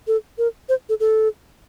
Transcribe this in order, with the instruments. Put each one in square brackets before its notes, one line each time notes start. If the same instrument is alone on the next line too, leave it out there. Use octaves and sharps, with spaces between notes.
[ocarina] A4
A#4
C5
A4
A4